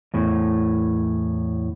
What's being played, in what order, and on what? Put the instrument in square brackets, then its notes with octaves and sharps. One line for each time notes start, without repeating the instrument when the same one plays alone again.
[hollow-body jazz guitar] E2 A2